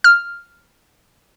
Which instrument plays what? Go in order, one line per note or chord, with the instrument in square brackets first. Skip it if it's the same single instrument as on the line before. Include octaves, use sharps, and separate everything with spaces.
[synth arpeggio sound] F6